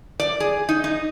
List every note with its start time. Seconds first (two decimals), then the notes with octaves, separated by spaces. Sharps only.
0.20 D5
0.40 G#4
0.69 D#4
0.84 D#4